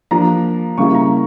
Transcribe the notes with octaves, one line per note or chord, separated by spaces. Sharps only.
F3 A#3 D4 F4 A#5
C#3 G3 A#3 E4 C#6
A#5